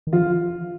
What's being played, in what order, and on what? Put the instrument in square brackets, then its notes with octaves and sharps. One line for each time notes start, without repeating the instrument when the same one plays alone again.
[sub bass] D#3
[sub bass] F3 [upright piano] F4